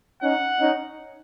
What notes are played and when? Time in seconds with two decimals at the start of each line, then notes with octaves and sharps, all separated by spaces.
0.22 C#4 D#4 F#5
0.60 C#4 D#4